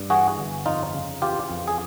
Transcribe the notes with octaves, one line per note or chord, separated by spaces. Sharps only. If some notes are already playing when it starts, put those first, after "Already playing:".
Already playing: G2
E3 F#4 G#4
G1
F2 D#4 F4
C#3
E3 F4 G4
F2
G#4